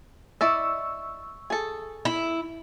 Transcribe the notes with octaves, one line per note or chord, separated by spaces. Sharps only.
E4 D5 D#5 C#6 E6
G#4 A4
E4